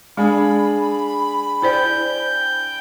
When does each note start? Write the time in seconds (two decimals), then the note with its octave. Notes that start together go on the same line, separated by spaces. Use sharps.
0.17 G#3 D4 G#4 B5
1.62 E4 C5 D5 G5 G6